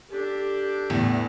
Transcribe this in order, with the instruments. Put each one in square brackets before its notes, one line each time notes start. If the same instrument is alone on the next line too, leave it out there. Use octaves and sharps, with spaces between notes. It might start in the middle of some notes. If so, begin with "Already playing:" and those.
[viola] D4 A4 [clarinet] G4
[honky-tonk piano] E2 [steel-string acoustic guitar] A2